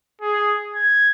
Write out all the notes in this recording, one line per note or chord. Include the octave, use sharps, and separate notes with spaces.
G#4
G#6